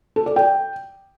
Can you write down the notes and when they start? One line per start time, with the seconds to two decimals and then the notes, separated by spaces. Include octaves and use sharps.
0.16 A4
0.26 D5
0.36 G5